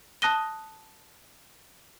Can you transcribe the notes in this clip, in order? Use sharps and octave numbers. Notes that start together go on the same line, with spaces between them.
A5 D#6 F#6 A#6 D#7 G7